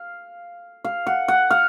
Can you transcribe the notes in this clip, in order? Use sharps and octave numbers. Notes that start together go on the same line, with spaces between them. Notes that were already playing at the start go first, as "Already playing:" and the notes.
Already playing: F5
F5
F#5
F#5
F5